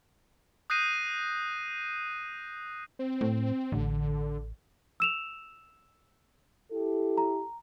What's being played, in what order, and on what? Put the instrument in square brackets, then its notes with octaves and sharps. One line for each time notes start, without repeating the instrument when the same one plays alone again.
[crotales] D#6 F#6 G6 A#6 C7 D#7
[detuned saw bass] C4
[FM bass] A2
[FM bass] A1 [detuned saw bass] D3
[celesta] E6 E7 F7
[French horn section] E4 G4 A4
[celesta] A#5